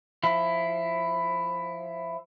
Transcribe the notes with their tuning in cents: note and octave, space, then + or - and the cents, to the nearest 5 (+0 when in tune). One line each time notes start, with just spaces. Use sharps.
F3 +0 E4 +10